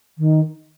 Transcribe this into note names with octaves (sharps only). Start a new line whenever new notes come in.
D#3